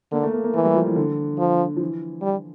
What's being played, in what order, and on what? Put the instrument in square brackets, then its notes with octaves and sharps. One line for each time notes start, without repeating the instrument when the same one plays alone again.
[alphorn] D3 [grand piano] A#3
[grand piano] A3
A#3
A#3
[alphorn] E3 [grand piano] A3
[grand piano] G3
F3
E3
D3
[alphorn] F3
[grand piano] F3
E3
[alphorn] G3